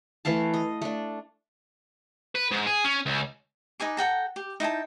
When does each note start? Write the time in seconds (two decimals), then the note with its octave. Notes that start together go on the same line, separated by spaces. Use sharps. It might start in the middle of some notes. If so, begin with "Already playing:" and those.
0.25 E3 A3 F5 A5
0.54 D#5
0.82 A3 D4
2.35 B4
2.51 G#2
2.67 G#4
2.84 C#4
3.06 C#2
3.80 D#4 B4 G#5 D6
3.97 A4 F#5 G5 A#5
4.36 G4
4.60 D#4 E4 G5 A5